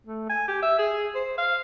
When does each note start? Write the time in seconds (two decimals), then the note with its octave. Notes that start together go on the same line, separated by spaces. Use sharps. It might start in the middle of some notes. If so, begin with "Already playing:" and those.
0.06 A3
0.30 G#5
0.48 G4
0.63 E5
0.78 G#4
1.15 C5
1.38 F5